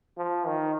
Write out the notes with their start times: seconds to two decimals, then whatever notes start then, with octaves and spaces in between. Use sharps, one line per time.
0.17 F3
0.46 D#3